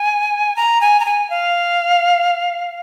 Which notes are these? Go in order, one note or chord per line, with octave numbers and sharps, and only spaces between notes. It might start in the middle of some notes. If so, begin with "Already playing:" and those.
Already playing: G#5
A#5
G#5
A#5
G#5
F5